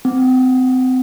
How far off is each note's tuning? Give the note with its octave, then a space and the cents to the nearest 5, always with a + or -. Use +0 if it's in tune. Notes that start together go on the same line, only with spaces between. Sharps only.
C4 -30